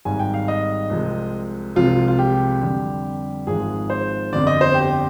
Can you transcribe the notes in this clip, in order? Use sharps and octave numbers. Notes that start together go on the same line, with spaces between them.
G#1 G#2 G3 G#5
G5
F5
D#5
C2 C3 F3 G#3
C2 C3 F3 G#3 F4
F4
G4
F2 D3 G3
G#1 G#2 F3 G#3 G#4
C5
G1 F2 D3 D5
D#5
C5
G4